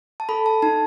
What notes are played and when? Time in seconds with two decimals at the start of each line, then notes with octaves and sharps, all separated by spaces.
0.20 A5
0.29 A4 B5
0.46 A5
0.62 D#4 A5